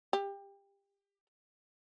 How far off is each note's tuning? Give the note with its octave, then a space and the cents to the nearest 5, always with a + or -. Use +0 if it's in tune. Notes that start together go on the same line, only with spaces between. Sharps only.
G4 +25